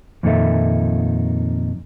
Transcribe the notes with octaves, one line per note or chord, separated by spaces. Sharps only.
F2 A#2 D#3 D#4 A4 E5